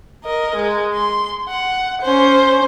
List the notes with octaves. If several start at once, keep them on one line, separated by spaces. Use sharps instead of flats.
A#4 D#5
G#3
C6
F#5
C#4 C5